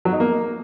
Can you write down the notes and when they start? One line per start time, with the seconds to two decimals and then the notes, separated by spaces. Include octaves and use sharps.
0.05 F#3
0.13 D#4
0.20 A#3